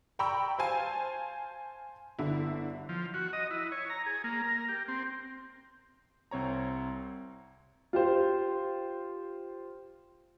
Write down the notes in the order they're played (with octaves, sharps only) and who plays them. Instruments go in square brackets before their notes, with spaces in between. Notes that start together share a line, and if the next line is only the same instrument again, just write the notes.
[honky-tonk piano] D5 G5 A#5 B5 C#6 E6
C5 F5 G#5 A5
G1 D3 E4
[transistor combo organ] F3
F#4
D#5
E4
C#5
A#5
G#4
A#3
A#4
G4
C4
[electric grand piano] C2 C4 C#5 A#5
[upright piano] F4 G4 C5